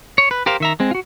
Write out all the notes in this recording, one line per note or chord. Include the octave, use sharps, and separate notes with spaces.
C#5
B4
G4 A#4 C5 F5
D#3 E5 A#5
G#3 C4
F4 F#4